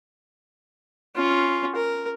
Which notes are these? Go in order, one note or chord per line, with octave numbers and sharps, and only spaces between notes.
C#4 F4
A#4